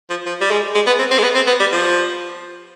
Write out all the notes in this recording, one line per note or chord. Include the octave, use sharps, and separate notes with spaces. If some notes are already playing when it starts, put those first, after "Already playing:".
F3
F3
G3
G#3
G#3
B3
C4
C4
G#3
B3
C4
B3
G3
F3